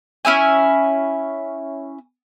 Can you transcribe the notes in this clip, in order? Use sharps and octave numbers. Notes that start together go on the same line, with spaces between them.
C#4 E4 E5 G#5